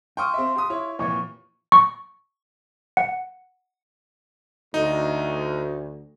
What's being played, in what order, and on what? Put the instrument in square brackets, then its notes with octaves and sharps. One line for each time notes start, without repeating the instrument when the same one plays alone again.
[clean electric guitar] F4 [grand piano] G5 C#6 D#6
[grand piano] C4 E5
G4 C6 D#6
E4 C#5
[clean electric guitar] F2 G4 C#5 [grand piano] A#2 E3
[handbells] C#6
F#5
[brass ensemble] D2 [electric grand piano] D#4